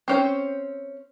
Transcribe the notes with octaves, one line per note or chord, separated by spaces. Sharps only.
C4 C#4 C5